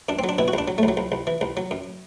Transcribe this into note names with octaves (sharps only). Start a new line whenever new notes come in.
F#2 D4
C4
F#3
D4
B2 E4
F#4
C2 D4
F#3
A3
C2
F#3
C2
C2
E3
C2
F#3
F#2